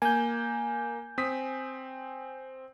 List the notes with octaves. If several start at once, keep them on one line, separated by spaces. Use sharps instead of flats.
A#3 G#5 G6
C4 D#6 B6